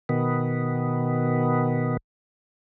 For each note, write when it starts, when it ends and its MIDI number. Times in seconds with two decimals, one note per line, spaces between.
0.09 1.97 47
0.09 1.97 51
0.09 1.97 59